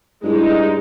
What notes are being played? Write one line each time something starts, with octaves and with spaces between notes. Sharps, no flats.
G2 G#3 D#4 E4